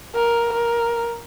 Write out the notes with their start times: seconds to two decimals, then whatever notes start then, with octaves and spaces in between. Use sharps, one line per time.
0.15 A#4
0.53 A#4